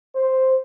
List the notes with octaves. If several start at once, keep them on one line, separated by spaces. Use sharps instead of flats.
C5